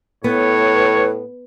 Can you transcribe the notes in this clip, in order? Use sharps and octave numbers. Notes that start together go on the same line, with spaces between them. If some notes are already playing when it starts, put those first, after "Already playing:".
A2 B3 B4 C#5